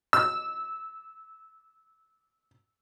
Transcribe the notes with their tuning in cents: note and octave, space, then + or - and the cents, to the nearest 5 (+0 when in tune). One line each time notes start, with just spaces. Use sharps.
E6 -15